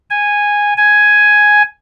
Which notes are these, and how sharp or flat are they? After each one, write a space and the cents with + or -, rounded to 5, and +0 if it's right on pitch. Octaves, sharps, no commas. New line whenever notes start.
G#5 -10
G#5 +5